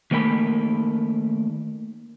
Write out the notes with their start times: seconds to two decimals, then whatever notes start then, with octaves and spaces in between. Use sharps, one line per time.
0.11 D#3 A3 A#3 E5 B5